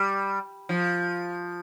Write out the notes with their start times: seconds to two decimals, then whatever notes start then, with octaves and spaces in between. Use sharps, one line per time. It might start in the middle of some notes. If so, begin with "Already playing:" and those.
Already playing: G3
0.69 F3